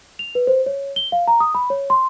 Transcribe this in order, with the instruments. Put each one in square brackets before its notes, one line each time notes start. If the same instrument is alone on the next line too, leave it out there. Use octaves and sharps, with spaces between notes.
[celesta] F7
B4
C5
C#5
G7
F5
A#5
D#6
B5
C#5
C6